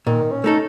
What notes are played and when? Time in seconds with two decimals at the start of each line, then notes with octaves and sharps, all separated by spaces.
0.07 A#2 D#3
0.32 C#4
0.44 A3 D#4 A4